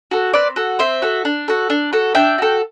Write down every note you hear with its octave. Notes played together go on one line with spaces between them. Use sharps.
F#4 A4
C4 B4 D5
F#4 A4
C4 C5 E5
F#4 A4
D4
F#4 A4
D4
F#4 A4
D4 E5 G5
F#4 A4